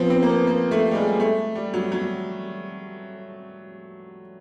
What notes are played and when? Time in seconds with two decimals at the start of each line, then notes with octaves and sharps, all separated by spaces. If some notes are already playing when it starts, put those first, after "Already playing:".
Already playing: F3 B3 C4
0.10 C4
0.23 A#3
0.29 B3
0.47 A#3
0.71 A3
0.91 G3
0.95 G#3
1.20 A3
1.55 G3
1.74 F#3
1.92 F#3